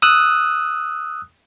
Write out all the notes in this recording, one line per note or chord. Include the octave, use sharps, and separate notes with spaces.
D#6 E6 F#6